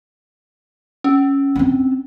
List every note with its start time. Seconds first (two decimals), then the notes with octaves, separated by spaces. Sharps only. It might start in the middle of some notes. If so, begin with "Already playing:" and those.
1.04 C#4
1.56 C4 D4